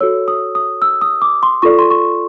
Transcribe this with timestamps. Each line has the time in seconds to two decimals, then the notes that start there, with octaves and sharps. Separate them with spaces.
0.01 F#4 A4 C#5 E6
0.28 D#6
0.55 D#6
0.82 E6
1.01 D#6
1.22 D6
1.43 C6
1.62 F4 A4 D5 C#6
1.79 C6
1.91 C#6